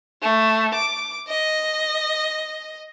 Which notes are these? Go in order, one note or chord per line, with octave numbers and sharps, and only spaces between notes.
A3
D6
D#5